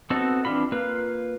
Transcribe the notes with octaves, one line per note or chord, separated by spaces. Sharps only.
B3 C4 D#4 F#4 A4
E3 C4 D4 F4 B5
A#3 F4 B4